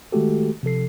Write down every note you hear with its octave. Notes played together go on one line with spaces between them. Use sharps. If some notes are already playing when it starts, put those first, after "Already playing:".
D#3 G#3 A3 F#4 G4 A4
C3 F3 A4 C7